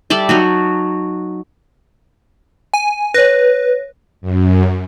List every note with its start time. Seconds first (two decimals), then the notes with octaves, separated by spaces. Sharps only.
0.10 G3 A4 D5 E5
0.29 F#3 D#4 F#4
2.74 G#5
3.14 B4 C#5 A#6
4.21 F#2